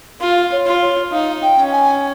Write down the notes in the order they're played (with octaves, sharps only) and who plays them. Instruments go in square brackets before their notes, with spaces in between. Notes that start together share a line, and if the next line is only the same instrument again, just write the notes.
[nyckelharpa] F4 [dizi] F5
[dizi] C#5
[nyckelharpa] F4
[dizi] C#5
[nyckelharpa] D#4 [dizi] F5
[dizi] G5
[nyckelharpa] C#4
[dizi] G#5